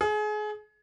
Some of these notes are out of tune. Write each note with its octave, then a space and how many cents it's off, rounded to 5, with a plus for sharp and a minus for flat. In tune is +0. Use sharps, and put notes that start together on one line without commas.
G#4 +30